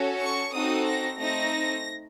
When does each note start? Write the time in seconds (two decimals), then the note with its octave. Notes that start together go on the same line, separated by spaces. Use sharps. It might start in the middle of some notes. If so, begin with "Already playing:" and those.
Already playing: C#4 F#4 A4
0.19 C#6
0.52 C4 D#4 F#4 A4 D#6
0.85 A#6
1.18 A3 C4 D#4 A#6